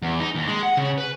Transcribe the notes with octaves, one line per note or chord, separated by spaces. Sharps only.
E2
D#4
D#2
G#3
F#5
C#3
B4